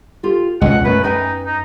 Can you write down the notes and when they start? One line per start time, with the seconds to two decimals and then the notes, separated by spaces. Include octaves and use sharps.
0.23 F4 G4 A4
0.61 C#2 B2 D#5 F#5
0.85 F#2 A3 B4
1.04 D#4 B4 G5 G#5
1.46 D#4